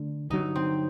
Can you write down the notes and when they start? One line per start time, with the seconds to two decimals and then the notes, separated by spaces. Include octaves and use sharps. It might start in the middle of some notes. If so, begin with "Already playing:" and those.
Already playing: D3 A3 D4
0.30 G2 D3 F#3 D#4
0.55 C4